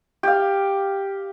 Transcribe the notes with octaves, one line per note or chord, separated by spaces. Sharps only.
G4 F5